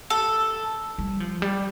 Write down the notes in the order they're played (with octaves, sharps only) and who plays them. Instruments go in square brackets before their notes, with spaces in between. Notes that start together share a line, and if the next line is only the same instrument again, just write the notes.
[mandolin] A4
[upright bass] G3
F3
G3